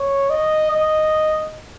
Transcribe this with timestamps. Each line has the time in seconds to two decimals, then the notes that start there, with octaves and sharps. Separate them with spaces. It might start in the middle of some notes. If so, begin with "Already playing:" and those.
Already playing: C#5
0.30 D#5
0.71 D#5